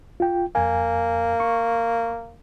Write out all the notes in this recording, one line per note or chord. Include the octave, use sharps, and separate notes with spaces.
F4 G5
F2 A#3 G#5
C#6